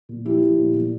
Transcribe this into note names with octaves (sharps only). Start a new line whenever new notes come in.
A#2
F3 E4 G4
F3
A#2
A#2